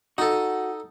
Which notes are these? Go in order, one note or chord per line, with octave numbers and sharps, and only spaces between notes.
D#4 F#4 A4